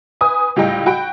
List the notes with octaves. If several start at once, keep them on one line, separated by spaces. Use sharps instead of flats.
B4 G#5 D#6
C#2 A2 G3 G#3 D#5 G5
F#4 G5 B5 D7